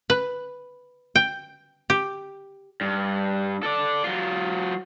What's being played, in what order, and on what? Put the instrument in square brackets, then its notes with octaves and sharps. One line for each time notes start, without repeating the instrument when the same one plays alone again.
[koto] B4
G5
G4
[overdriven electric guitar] G2
A4 D5
F#3 F4